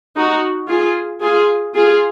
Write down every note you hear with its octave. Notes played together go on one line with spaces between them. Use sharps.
D#4 F#4
F4 G#4
F4 G#4
F4 G#4